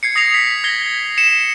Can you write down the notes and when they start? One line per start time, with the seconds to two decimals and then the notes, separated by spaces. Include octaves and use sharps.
0.03 G#6 C7 C#7
0.16 D#6 A#6 C7 F7
0.34 B6 C7
0.64 G#6 A#6 C7 G7
1.18 C#7 E7